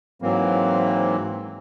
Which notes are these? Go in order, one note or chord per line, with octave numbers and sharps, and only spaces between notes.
G#2 E3 F#3 A#3 C4